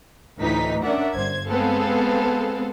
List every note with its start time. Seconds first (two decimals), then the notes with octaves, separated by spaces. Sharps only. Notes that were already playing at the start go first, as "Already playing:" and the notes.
0.38 D2 A2 E3 D#4 B6
0.82 C#4 D4 A#4 D5 E5 F#5
1.15 G1 C5 G#6
1.47 G#3 B3 C4 G#4 A4 F5